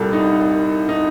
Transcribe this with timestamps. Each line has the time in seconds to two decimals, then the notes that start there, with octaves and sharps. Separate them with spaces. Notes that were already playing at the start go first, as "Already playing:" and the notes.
Already playing: C2 A#2 G3 A4
0.13 D#4
0.89 D#4